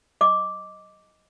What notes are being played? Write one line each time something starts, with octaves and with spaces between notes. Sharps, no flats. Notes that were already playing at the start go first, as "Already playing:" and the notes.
D#5 D6